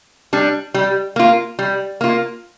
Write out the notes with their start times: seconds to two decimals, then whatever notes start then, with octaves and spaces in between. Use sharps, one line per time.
0.33 G3 D4
0.74 G3
1.16 A#3 F4
1.59 G3
2.01 A#3 F4